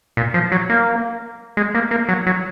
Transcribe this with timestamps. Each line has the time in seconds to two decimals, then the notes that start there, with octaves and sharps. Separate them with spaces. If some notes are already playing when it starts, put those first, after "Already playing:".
0.17 A#2
0.34 F3
0.52 F#3
0.69 A#3
1.57 G#3
1.75 A#3
1.91 A#3
2.09 F#3
2.27 F#3